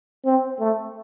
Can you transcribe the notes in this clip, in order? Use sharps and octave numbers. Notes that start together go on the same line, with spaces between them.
C4
A3